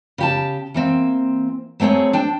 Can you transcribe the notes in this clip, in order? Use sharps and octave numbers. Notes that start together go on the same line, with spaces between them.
C#3 G4 A5
E3 A#3 C4
F#3 A3 C4 G#4 C#5
D4 G5 A5